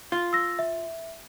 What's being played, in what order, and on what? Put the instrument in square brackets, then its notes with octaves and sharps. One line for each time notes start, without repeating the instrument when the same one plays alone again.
[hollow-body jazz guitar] F4
[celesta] E6 A#6
E5